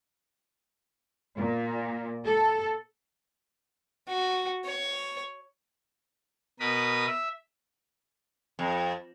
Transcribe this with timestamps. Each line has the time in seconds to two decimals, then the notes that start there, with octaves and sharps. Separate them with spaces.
1.38 A#2
2.26 A4
4.08 F#4
4.64 C#5
6.60 B2 A#4 B4 B5 D#6
7.06 E5
8.59 F2